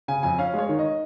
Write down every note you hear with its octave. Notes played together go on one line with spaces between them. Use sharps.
C#3 G#5
F2 G#5
C#4 F5
G#3 C#5
D#3
D#5